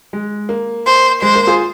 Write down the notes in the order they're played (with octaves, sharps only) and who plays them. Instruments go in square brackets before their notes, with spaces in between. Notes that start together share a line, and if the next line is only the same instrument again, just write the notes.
[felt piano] G#3
A#3
[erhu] C5
[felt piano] G#3 [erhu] C5
[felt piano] A#3
F4 G#4